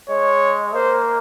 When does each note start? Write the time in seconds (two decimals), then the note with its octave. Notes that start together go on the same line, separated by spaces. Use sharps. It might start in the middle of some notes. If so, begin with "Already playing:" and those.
0.09 G#3 C#5
0.75 A#3 C5